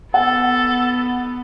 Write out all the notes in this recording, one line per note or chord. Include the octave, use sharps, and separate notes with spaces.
B3 A4 F#5